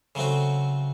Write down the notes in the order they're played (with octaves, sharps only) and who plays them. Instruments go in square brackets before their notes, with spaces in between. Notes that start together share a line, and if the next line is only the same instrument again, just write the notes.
[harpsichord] C#3 F#3 A3 C4 F#4